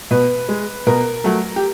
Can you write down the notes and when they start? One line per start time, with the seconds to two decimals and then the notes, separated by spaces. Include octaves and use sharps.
0.11 B2 B4
0.49 G#3
0.87 B2 A#4
1.24 F#3 A3
1.56 G4